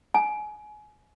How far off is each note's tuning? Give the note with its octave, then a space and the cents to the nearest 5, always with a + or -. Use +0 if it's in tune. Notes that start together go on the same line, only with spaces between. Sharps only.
G#5 +25